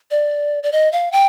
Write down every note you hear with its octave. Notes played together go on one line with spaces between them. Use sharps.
D5
D5
D#5
F5
G5